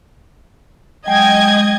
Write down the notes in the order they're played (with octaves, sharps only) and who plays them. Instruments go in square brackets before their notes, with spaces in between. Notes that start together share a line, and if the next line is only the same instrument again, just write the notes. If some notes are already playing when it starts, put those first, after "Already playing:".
[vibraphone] F#3 G#3 [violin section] D#5 G#6 [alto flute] G5